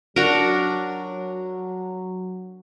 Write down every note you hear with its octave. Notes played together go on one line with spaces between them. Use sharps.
F#3 D4 F#4 A#4